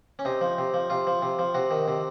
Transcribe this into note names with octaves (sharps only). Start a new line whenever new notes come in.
C#4
C3 D#4
F3
C3
F3
C3 F4
F3
C3
F3
C3 F#4
D#3
C3